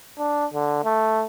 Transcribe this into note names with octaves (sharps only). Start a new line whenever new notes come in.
D4
D3
A3